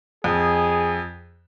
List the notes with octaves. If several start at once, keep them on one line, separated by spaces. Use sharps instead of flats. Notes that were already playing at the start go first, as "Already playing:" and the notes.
F2 G#4